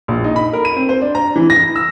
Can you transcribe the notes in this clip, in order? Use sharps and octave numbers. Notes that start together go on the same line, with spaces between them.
A#1
D#4
B5
A#4
D#7
C4
C5
D4
A#5
E3
A#6
E6